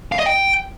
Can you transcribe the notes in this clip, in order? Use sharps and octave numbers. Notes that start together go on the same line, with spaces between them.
F5
D#5
G5